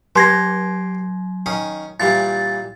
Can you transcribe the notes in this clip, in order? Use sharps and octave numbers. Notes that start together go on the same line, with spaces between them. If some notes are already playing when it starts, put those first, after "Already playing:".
F#3 G4 C5 C6 G#6 A#6
D#3 C#4 D#6
A#2 E3 G3 A6